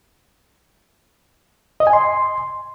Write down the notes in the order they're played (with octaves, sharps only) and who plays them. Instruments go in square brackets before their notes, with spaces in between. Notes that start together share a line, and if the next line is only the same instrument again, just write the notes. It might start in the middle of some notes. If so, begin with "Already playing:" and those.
[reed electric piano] D#5
G#5
C6